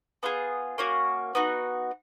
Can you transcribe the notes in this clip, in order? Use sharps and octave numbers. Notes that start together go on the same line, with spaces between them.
B3 F4 G#4
A#3 C#4 F#4
B3 D#4 F#4